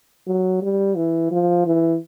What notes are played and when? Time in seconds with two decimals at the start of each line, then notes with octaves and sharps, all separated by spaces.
0.27 F#3
0.62 G3
0.96 E3
1.31 F3
1.66 E3